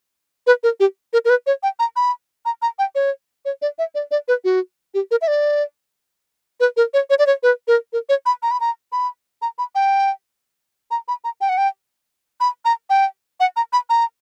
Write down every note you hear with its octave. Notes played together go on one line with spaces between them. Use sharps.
B4
A#4
G4
A#4
A#4
B4
C#5
G5
A#5
B5
A#5
A#5
G5
C#5
C#5
D5
E5
D5
D5
B4
F#4
G4
A#4
E5
D5
B4
A#4
C#5
C#5
D5
C#5
B4
A#4
A#4
C#5
B5
A#5
B5
A#5
B5
A#5
B5
G5
A#5
B5
A#5
G5
F#5
G5
B5
A#5
G5
F#5
A#5
B5
A#5